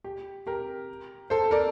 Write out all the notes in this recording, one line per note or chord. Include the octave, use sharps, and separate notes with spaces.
G4
G4 A#4
A4 C5
A#4 D5